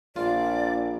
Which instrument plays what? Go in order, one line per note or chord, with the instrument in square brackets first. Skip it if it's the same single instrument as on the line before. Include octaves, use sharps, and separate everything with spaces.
[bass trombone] A#1 [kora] F4 [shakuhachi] D5